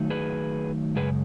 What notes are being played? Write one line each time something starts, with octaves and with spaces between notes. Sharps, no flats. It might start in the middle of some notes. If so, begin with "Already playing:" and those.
Already playing: D#3 F#3 A3 D#4
G#4 B4
F#2 C#3 G#3 G#4 B4